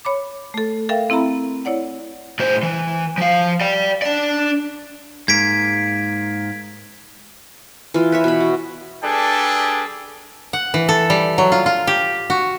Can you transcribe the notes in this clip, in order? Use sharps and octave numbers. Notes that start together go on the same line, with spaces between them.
C#5 B5 D6
A3 A4
A4 A#4 E5 F5 G5
C4 E4 E5 A#5 B5
E4 C#5 D5 F#5
A2 C5
E3
F3 F5
D5 G5
D4 D5
G#2 A#3 G#6 B6 D7
E3 F4
B4 C#5 E5
B2 B5
F#4
G3 D4 G#4 A4 B4 G5
F#5
E3
A4
G3
F#3
F4
F4
G4
F#4